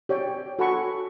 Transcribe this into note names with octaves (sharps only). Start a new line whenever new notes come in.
G4 C#5 D5 G5
F#4 A4 F#5 G#5 B5 C#6